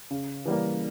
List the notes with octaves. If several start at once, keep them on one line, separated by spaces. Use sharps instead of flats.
C#3
E3 G3 A#3